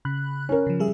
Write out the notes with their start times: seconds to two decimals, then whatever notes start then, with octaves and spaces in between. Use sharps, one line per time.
0.05 C#3 B5 F#6
0.49 C#4 A#4
0.67 C#3 F3
0.80 G3 G#4 E5